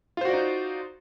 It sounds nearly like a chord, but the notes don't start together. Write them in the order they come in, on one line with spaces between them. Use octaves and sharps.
F4 C5 F#4 D5 D#4